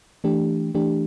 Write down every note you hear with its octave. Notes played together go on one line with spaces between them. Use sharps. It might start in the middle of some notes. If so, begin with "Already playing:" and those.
E3 A3 D4 G4
E3 A3 D4 G4